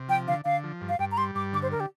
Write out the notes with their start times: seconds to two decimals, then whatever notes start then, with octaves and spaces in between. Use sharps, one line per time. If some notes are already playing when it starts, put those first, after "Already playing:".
Already playing: C3
0.08 F3 G5
0.28 D3 F5
0.45 D3 F5
0.64 F3
0.81 G2
0.89 F5
0.99 G2 G5
1.11 A#5
1.17 G3 C6
1.35 G2 D6
1.53 D3 D6
1.62 C5
1.72 A#4
1.80 G4